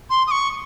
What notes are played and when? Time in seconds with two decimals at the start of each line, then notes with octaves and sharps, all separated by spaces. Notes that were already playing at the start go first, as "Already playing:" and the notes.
0.10 C6
0.27 D#6
0.31 C#6